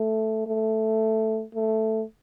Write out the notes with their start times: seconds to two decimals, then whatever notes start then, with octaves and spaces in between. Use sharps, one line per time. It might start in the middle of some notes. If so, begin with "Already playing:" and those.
Already playing: A3
0.47 A3
1.55 A3